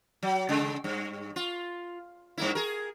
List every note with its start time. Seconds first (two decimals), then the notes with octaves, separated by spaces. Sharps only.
0.23 F#3
0.49 C#3 G#3
0.84 G2
1.36 F4
2.38 G2 A#3 E4
2.55 G#4 A#4